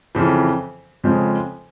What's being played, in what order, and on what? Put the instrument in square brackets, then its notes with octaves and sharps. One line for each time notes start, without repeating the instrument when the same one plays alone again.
[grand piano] F2 C#3 E3
F2 C#3 F3 G#3